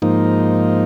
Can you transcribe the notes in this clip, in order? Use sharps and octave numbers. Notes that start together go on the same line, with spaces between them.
G#2 F3 A#3 D#4